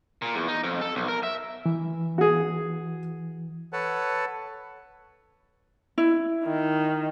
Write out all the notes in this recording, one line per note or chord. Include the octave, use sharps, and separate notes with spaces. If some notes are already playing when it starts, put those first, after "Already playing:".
A#2
E2
D#4
F2
A4
B1
A#4
E5
E3
F#4 G#4
A4 B4 C#5 F#5 A5
E4
D#3